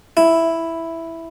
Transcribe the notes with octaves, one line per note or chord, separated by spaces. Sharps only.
E4